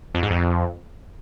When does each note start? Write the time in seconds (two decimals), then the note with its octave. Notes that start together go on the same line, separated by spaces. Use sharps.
0.14 F2
0.23 G#2
0.31 F2